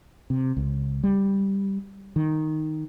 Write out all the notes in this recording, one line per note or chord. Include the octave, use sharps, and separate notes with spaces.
C3
C#2
G3
D#3